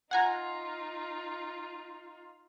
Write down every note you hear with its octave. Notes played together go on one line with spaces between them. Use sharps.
D#4 F4 F#5 G#5 A#5